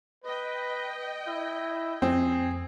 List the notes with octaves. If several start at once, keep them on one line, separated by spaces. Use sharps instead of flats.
B4 D#5 G5
E4
F2 C4 G#4